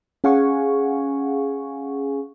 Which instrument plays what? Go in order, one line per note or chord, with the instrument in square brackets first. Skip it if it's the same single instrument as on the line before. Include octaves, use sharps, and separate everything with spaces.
[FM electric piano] C#4 G#4 F5 F#5 G#5 C#6